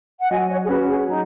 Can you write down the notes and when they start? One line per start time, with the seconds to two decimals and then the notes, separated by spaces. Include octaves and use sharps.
0.21 F#5
0.30 F#3 D#5 G#5
0.50 C#5 F#5
0.64 G#4
0.69 C#4 F#4 B4
0.88 G#4
1.08 F#3 D#4